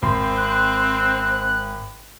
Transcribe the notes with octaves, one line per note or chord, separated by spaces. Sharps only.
G#1 C4 C6
F#6